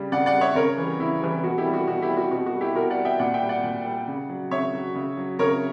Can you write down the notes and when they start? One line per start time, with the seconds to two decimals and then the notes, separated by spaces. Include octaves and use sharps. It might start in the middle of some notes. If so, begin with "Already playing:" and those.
Already playing: C#3 G3
0.12 C#3 D5 F#5
0.26 D5 F#5
0.33 G3
0.41 C#5 E5
0.55 C#3 A#4 C#5
0.78 E3 G3
1.00 C#3 E4
1.22 E3 G3
1.43 B2 F#4
1.58 E4 G4
1.66 G3
1.74 F#4
1.88 B2 F#4
2.02 E4 G4
2.10 G3
2.17 F#4
2.31 B2 F#4
2.46 F#4
2.53 G3
2.61 E4 G4
2.75 B2 F#4 A#4
2.90 D5 F#5
2.97 G3
3.05 E5 G5
3.19 A#2 D5 F#5
3.34 E5 G5
3.42 G3
3.49 D5 F#5
3.64 A#2
3.86 G3
4.08 C#3
4.29 F#3
4.51 C#3 C#5 E5
4.73 F#3
4.95 C#3
5.17 F#3
5.39 C#3 A#4 C#5